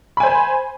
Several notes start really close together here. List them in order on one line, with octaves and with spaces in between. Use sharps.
B5 G#5 C5